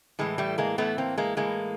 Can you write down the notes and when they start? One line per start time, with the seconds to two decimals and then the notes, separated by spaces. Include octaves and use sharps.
0.19 A2 E3 G#3
0.38 G3 A3
0.58 G#3 A#3
0.78 A2 E3 A3 B3
0.98 A#3 C4
1.17 G#3 A#3
1.37 A2 E3 G#3 A#3